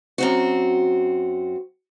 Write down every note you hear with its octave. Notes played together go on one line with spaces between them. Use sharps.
F#2 C4 F#4